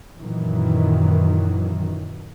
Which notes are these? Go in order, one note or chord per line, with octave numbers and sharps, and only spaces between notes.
F#2 A#2 D#3 E3 F#3